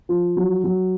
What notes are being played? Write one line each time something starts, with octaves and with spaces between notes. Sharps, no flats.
F3
F#3
F#3